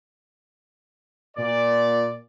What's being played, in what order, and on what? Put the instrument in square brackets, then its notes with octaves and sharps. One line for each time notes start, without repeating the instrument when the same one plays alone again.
[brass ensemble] A#2 D5